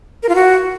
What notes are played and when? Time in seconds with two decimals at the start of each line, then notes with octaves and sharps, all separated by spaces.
0.23 A#4
0.29 F4
0.35 F#4